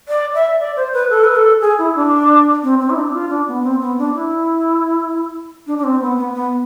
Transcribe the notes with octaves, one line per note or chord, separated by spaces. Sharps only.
D5
E5
D5
C5
B4
A4
B4
A4
G#4
E4
D4
C4
C4
E4
D4
F4
D4
B3
C4
B3
D4
E4
D4
D4
C4
B3
B3
B3